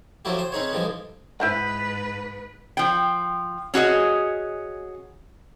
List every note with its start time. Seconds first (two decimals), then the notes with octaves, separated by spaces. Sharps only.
0.25 F3 F#3 A3 E4 F#4 G4
0.39 C5
0.52 C4 C#4 D#4 G#4 B4 C#5
0.72 D3 E3 F3 G3 G#3
1.40 G#2 E4 B4 C5 F#5
2.77 F3 G5
3.74 C#4 F#4 G#4 D#5